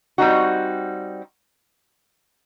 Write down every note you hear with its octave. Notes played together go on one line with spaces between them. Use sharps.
G3 C4 D#4 F#4